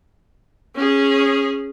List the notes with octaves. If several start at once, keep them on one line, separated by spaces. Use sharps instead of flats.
C#4 G#4